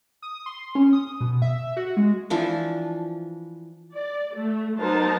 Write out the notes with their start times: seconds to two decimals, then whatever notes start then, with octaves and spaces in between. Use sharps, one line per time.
0.22 D#6
0.46 C6
0.75 C#4
0.93 D#6
1.21 B2
1.42 E5
1.77 F#4
1.97 G#3
2.30 E3 F3 D4
3.93 D5
4.35 A3
4.79 F#3 B3 D#4 A#4 C5 A5